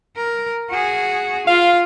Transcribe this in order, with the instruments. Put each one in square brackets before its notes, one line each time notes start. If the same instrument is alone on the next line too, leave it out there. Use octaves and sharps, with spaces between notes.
[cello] A#4
F#4 G#4
[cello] F4 [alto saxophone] F5